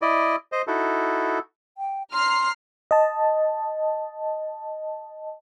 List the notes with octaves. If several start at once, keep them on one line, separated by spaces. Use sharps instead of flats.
E4 D5 D#5
C5 D#5
D#4 E4 F#4 A4
G5
A#5 C6 F6 C7
D#5 A5